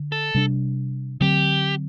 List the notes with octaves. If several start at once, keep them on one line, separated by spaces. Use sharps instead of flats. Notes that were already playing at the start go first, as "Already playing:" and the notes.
Already playing: D3
A4
C3 G3 A#3 D4
D3 F#3 C4 G4